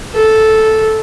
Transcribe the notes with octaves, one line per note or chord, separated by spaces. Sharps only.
A4